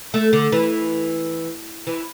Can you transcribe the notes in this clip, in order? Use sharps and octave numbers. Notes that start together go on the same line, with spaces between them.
A3
D3
E3
E3